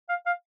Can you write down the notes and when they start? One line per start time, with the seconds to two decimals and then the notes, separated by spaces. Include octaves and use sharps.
0.09 F5
0.26 F5